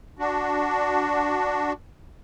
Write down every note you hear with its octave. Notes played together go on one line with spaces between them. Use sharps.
D4 F#4